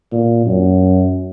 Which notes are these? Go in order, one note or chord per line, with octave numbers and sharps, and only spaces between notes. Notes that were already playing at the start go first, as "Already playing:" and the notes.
A#2
F#2